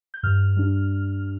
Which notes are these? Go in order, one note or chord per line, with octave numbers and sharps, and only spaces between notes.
G6
G2 F6
G3 D4